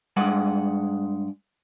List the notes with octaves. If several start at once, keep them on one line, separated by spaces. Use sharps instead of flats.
G2 G#3 F#5